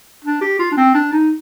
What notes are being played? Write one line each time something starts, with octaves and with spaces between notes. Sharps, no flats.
D4
G4
F4
D4
C4
D4
D#4